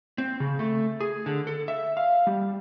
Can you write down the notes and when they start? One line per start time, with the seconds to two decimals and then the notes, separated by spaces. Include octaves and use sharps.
0.18 C4
0.40 C#3
0.59 A3
1.01 G#4
1.26 D3
1.47 A4
1.68 E5
1.97 F5
2.27 G3